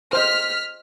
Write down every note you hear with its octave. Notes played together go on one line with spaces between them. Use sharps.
C5 D#5 F6 B6